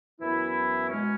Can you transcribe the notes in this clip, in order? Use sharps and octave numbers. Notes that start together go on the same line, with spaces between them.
F#2 E3 B3 E4
B2 G#3 C#4